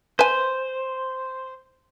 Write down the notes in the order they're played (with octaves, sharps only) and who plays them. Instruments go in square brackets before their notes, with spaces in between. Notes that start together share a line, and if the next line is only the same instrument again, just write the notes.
[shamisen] B4 G#5 [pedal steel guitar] C5